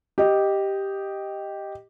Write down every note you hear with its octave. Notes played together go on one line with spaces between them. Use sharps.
G4 D#5